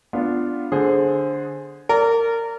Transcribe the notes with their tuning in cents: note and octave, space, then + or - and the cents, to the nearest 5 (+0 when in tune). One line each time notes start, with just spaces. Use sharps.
B3 +0 D4 +0 F4 +0
D3 +0 G#4 +0 C5 +15
A#4 -20 D5 -30